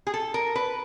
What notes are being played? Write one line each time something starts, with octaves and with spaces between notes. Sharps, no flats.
G#4
A4
A#4
B4